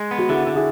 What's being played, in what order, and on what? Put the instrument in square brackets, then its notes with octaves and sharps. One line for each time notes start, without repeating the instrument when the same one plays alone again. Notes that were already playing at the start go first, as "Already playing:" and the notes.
Already playing: [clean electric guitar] G#3
B3
[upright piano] F#4
[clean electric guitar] D3 [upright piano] E4 G#4
[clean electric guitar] D3
[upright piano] E4 G#4